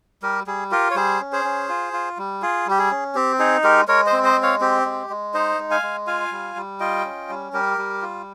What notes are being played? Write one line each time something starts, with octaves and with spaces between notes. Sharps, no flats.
G3 G4 A#4
G3 G#4
F4 G4 A#4
C#5
G3 G#4 C5
C#4
G#4 C5
C#4
F4
F4
G3
F4 G#4
G3 G4
G#4
C#4
C4 G4
D#4 G#4
G#3 G4 A#4
G#3 A#4 C#5
C5 D#5
C4
C5 D#5
G#3
C#5 F5
C4 G4
G#3
G#3
D#4 C5 D#5
G#3
F5 G#5
G#3
F4 F5 G#5
G3
G3
F4 D#5 G5
C#4
G3
G3 G4 A#4
G3
F4